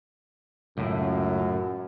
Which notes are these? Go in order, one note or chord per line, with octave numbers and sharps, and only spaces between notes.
C#2 F#2 A2